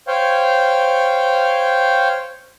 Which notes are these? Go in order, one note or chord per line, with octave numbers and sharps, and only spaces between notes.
C5 C#5 F5 G5